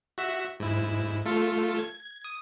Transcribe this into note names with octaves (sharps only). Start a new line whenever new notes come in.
F#4 E5
G#2 E4
A3 F4 A4
G#6
D#6